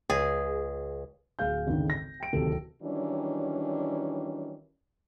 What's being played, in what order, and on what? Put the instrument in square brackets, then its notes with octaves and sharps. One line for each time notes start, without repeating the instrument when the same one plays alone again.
[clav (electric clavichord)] C#2 [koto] G#4
[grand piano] D1 G#4 F5 G6
G#1 D2 G#2 C#3
A#6
G5 D7
D1 D#2 C3 A4
[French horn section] D#3 E3 F#3 G3 C#4 D4